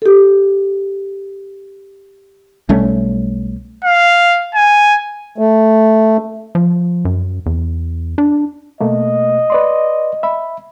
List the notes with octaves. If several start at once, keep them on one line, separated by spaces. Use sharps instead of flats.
G4 A4
B1 G3 A3 C#4
F5
G#5
A3
F3
F#2
E2
D4
B2 A3 A#3 D#5
B4 D5 C6
E5 B5